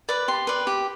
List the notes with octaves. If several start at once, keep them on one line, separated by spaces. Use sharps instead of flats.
B4 D5 D6
G4 C6
B4 D5
G4